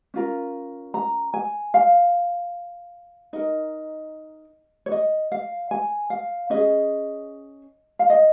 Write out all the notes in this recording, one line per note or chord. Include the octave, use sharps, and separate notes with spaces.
C#4 F4 A#4
A#5
G#5
F5
D#4 A#4 D#5
C#5
D#5
F5
G#5
F5
C#4 G#4 D#5
F5
D#5